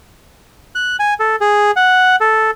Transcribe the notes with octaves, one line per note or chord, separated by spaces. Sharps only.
F#6
G#5
A4
G#4
F#5
A4